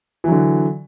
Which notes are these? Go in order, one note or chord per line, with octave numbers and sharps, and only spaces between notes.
D3 E3 F#3